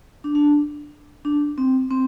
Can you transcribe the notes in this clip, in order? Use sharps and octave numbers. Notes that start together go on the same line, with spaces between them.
D4
D4
D4
C4
C4